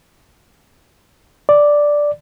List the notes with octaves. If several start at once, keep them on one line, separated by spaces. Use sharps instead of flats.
D5